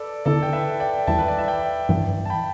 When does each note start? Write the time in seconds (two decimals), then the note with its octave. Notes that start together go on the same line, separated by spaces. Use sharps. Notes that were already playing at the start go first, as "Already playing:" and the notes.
Already playing: A4 B4 D5
0.25 D3 B3 E4 A4 D5
0.43 G5
0.53 B4 E5
0.80 D5 G5
1.07 E2 E3 G3 E4 E5 A5
1.18 B4
1.28 D5
1.38 E5
1.48 D5 G5
1.89 G2 E3 B3
2.25 A5
2.30 G5 B5